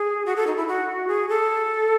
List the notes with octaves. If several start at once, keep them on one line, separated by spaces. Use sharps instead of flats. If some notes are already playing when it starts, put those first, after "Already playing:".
Already playing: G#4
F#4
A4
D#4
E4
F#4
G#4
A4